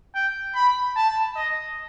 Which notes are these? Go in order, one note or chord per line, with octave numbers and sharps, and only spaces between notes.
G5
B5
A5
D#5